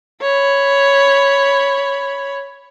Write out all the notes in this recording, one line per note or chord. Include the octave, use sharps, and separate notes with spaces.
C#5 B5